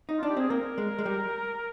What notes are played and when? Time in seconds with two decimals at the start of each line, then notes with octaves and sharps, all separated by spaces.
0.09 D#4
0.18 F4
0.23 D4
0.29 G4
0.37 C4 G#4
0.50 A#3 A#4
0.78 G#3
0.99 G#3
1.05 G3